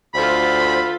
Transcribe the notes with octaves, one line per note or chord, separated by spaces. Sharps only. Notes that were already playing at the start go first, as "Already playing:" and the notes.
D2 F4 A4 C5 B5